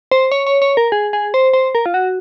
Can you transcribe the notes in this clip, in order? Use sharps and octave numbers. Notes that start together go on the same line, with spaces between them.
C5
C#5
C#5
C#5
A#4
G#4
G#4
C5
C5
A#4
F4
F#4